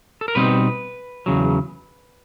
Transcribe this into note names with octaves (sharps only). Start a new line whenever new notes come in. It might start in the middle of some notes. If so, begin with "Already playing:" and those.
A4
A#4
B2 G3 C4 D#4 B4
E2 C#3 F#3